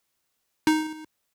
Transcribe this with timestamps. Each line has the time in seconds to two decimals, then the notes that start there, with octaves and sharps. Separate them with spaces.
0.67 D#4